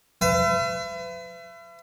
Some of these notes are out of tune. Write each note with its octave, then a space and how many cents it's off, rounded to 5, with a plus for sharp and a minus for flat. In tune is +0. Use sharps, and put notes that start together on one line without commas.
B4 +40 E5 +40